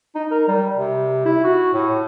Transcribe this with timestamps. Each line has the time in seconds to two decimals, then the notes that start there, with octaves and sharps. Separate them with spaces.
0.15 D#4
0.31 A#4
0.48 G3
0.77 C3
1.25 E4
1.44 F#4
1.73 A2